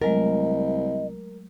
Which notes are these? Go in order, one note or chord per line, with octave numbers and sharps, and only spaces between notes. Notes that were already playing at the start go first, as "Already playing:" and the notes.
C2 F#3 G#3 A3 A#4 D#5